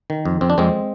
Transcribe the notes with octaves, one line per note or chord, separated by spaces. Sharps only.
D#3
F2
F2 C4
D4
F2 G#3 C4